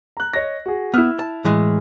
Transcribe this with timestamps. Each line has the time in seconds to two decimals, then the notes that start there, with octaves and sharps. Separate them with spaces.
0.17 A#5 F#6
0.33 C#5 D#5 A#6
0.66 F#4 G#4
0.94 B3 E4 E6 F6
1.19 A5
1.45 A2 E3 G#3